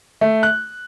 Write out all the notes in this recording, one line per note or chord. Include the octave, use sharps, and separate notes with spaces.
A3
F#6